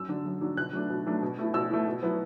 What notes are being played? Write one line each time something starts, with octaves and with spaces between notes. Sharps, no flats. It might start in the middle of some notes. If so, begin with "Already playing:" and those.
Already playing: F#2 E6
D3 F#3 D4
F#2
D3 F#3 D4
B2 F#6
F#3 A3 D4
B2
F#3 A3 D4
B2
A3 E4
B2 E6
A3 E4
B2
F#3 B3 E4